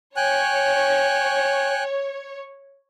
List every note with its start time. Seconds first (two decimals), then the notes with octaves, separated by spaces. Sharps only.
0.17 C#5 G5 G#5 F#6